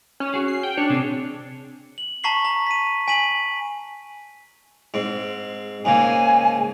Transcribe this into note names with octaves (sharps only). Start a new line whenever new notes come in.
C#4
F#4 G#4
C7
G5
D4 C#5
C3 C4 G#4
F#7
A5 A#5 C#6 B6 C7 F#7
A#5
B6 D#7
G#5 B6 D#7 F#7
G#2 C4
G#2 C#3 A#3 G#5